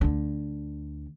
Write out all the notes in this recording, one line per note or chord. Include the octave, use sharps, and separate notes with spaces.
D2 D3